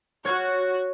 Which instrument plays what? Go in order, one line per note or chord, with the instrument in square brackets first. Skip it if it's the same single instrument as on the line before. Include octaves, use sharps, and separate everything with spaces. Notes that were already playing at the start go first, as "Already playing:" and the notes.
[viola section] F#4 [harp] C#5 F6 G#6